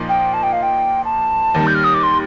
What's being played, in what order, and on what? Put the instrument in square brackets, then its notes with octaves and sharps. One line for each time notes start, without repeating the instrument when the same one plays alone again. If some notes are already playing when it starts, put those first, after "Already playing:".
Already playing: [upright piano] A#2 F3 A#3 D#4
[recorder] G5
A5
G5
F5
G5
A5
[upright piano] D#2 D#3 G3
[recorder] G6
F6
D#6
D6
C6